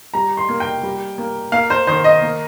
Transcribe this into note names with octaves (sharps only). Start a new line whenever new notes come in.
G3 A#5
C6
A#3
G5
G3
A#3
A#3 F5
C5
D#3 C5
D#5
A#3